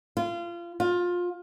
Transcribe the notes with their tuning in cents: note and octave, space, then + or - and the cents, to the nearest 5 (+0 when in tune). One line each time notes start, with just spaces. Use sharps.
F4 -25
F4 +20